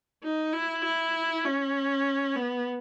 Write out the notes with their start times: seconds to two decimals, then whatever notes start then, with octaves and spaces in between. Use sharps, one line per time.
0.24 D#4
0.53 E4
0.84 E4
1.44 C#4
2.36 B3